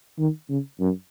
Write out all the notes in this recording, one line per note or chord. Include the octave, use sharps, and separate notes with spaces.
D#3
C#3
F#2